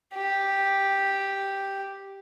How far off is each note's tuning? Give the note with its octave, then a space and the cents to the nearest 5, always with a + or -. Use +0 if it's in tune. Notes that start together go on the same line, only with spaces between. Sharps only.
G4 +0